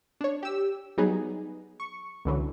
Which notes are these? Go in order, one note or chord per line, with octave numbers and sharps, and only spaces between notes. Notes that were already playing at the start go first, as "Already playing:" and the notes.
D4 C#5
G4 E6
F#3 G3 B3 D#4 G#4
C#6
C#2 D3 E3 F#3